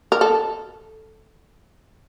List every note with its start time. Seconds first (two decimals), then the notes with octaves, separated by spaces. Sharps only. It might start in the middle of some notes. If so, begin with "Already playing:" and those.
0.12 A#4
0.21 A4